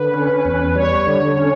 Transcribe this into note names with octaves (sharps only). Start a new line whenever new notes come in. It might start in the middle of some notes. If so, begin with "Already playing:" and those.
Already playing: D3 B4
C#4
E2
G3 C#5
D3
C#4